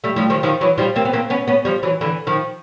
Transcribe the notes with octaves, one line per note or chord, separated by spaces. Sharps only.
G3 A3
F3 G3
D#3 F3
D#3 F3
E3 F#3
F3 G3
A#3 C4
B3
A#3 C4
B3 C#4
B3 C#4
F3 G3
E3 F#3
D3 E3
D#3 F3